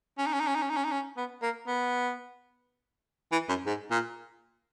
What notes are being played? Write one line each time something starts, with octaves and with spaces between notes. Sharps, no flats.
C#4
D#4
C#4
D#4
C#4
D#4
C#4
D#4
C#4
D#4
C#4
B3
A#3
B3
E3
F#2
G#2
A#2